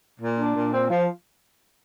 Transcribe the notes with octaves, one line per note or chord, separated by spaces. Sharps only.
A#2
D4
A#2
C4
F3